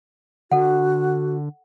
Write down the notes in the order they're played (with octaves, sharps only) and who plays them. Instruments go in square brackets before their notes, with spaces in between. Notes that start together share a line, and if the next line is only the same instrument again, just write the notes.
[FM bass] D3 [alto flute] F#4 [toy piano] A4 F#5